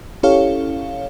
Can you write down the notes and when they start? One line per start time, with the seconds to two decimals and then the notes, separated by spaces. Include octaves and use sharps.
0.23 C#4 E4 G4 A4 C#5 F5